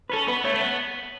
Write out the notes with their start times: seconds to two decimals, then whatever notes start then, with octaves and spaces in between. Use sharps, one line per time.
0.10 B4
0.13 C#4 A4
0.28 B3 B4
0.44 A3 C#5
0.54 A3
0.61 B3